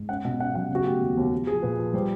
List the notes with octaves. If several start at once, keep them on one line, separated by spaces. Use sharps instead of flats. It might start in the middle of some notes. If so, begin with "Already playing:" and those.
Already playing: G#2
C#4 F#5
B2 F#5
C#4 F#5
F5
F#3 F#5
C#3 F#4
A3 G4
D#2
D#2
F3
F3 G#4
A#2 B4
F3
G3 C5